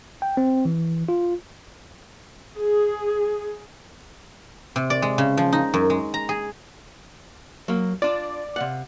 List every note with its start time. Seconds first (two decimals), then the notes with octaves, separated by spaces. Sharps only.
0.22 G5
0.37 C4
0.65 E3
1.09 F4
2.59 G#4
4.76 C3
4.90 D5
5.02 G#3
5.18 C#3
5.37 F3
5.53 D#4
5.74 F#2
5.90 G#3
6.14 A#5
6.29 G#4
7.68 F#3 A#3
8.02 D4 F4 D5
8.56 C3 F5 F#5